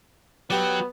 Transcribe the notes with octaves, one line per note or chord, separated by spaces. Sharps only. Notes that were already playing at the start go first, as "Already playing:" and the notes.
F#3 B3 G4 D5